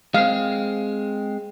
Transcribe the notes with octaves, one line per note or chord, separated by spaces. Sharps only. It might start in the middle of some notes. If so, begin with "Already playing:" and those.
G#3 C4 F5